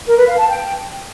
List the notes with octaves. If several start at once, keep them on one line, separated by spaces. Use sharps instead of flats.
A#4
B4
F5
A5
G5